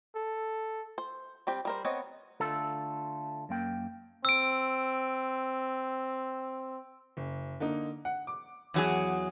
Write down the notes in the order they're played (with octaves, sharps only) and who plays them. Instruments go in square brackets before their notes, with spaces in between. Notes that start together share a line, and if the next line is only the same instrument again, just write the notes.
[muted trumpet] A4
[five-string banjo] C5
G3 C4 G4
G3 A#4 C5
B3 C4 C#5 D#5
[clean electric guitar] D3 A3 F4 A4
F#2 A#3 G5
[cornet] C4 [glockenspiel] E6 D7
[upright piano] F#1
D3 A#3 D#4
F#5
D6
[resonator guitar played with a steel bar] E2 F#3 G#4